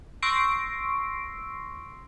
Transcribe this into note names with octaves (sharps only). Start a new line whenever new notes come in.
C6 C#6 E6 A#6 C7 D7